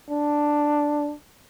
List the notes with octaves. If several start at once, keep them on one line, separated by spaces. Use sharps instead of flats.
D4